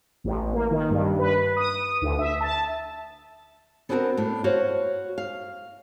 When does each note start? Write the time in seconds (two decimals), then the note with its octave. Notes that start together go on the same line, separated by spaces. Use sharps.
0.24 A1
0.53 A#3
0.71 D#3
0.90 G2
1.19 B4
1.57 D#6
2.01 D2
2.19 E5
2.41 A5
3.89 B3 C4 D4 F#4 G#4 A#4
4.17 A2 D4
4.44 F#4 C5 C#5 F5
5.18 F5